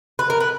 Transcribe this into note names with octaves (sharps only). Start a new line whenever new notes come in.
B4
A#4
B4